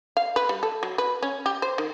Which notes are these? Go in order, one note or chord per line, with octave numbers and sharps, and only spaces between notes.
F5
B4
G3
A4
F#3
B4
C#4
G4
C5
D#3